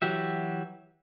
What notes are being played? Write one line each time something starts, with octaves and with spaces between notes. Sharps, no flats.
E3 F#3 F#4 G4 E5